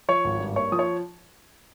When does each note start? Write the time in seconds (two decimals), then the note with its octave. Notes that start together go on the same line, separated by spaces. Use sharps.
0.08 F3 C#5 C#6
0.25 G#1
0.40 G2
0.56 A#3 C#5 C#6
0.72 F3 D#6
0.79 C#5 C#6